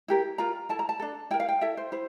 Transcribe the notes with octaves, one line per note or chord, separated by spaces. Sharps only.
E4 G4 A#4
F4 A#4 A#5
E4 A4 A5
A#5
A5
D4 A4
E4 A#4 G5
F5
G5
E4 A4 E5
C5
E4 C5